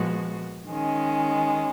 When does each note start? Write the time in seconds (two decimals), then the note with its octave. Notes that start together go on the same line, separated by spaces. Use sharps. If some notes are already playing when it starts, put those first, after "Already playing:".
Already playing: A#2 F3 G#3 B3 F#4
0.69 D#3 G#3 C#4